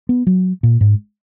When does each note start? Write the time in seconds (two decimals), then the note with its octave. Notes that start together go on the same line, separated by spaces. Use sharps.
0.09 B3
0.27 F#3
0.63 A#2
0.81 G#2